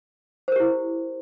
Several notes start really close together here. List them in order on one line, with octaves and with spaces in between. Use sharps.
C5 A#4 G4 E4